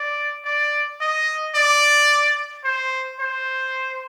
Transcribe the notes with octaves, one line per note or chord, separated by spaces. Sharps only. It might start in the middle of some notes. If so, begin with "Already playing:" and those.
Already playing: D5
D5
D#5
D5
C5
C5